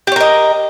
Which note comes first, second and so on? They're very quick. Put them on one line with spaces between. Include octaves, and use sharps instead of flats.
G4 C#5 A#4 D#5